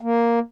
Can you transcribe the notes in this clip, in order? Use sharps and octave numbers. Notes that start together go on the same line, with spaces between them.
A#3